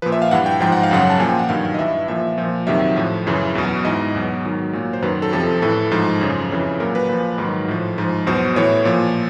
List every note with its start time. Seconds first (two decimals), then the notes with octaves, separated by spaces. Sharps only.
0.02 A#2 F3 B4
0.12 E5
0.22 F5
0.31 G2 E3 F#5
0.46 G5
0.61 G#2 F3 G5
0.72 F#5
0.83 F5
0.91 F#2 C#3 F#3 F#5
1.10 A5
1.20 A#2 F3 G#5
1.29 G5
1.39 F#5
1.49 G2 D#3 F#3 F5
1.65 F5
1.74 D#5
1.78 G2 E3 E5
2.08 A#2 F3 E5
2.38 A#2 F3
2.67 F2 C3 D#3 F#3 E5
2.96 A2 F3
3.27 F#2 C#3 E3
3.55 E2 B2 F#3
3.85 G#2 E3 D#5
4.14 E2 B2 F#3
4.45 G#2 D#3 F#3
4.73 A#2 F#3
4.93 C5
5.02 F#2 D#3 F#3 B4
5.22 A4
5.32 F2 C3 F3 A4
5.62 A2 E3 A4
5.91 G#2 F3
6.21 F#2 C#3 F3
6.51 F2 C#3 E3
6.80 A#2 F#3 A#4
6.95 B4
7.09 A#2 F3 B4
7.38 G#2 D#3 F#3
7.68 A2 F3
7.98 G#2 F3
8.26 E2 B2 F#3 C5
8.56 A2 E3 C#5
8.85 A#2 F3